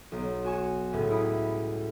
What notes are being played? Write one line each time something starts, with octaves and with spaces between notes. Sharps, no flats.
B1
F#4 G#5 C#6 E7
C#2 A2
E4 B5 D#6